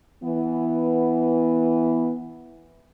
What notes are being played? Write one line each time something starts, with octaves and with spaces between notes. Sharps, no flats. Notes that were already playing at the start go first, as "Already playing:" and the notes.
E3 B3